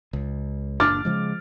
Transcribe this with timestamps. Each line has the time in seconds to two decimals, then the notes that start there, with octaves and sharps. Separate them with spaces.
0.13 C#2
0.80 F#1 A#2 D4 D6 F6 A6
1.05 C#3 F3 G#3